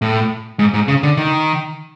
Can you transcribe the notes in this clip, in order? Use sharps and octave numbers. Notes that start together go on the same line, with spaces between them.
A2
G#2
G#2
C#3
D3
D#3